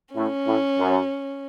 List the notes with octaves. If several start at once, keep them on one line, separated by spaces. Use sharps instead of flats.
A2 C#4
A2
F#2